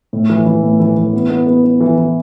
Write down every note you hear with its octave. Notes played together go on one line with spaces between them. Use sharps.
A2
E3
E3
A2
E3
E3
B3
B3
B3
B3
E3
E3